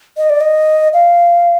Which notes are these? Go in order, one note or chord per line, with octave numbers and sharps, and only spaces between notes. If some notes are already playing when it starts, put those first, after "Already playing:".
D#5
D5
D#5
F5